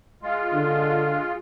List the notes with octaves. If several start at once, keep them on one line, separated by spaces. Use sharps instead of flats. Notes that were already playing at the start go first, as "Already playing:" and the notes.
G#3 F4
D3